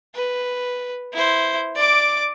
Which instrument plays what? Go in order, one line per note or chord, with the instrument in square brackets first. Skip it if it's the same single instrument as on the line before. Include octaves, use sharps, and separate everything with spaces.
[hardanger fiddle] B4
E4 C5
D5 D6